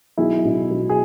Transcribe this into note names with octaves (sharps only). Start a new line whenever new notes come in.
B1 E4 G#4
B2
F#3
G#4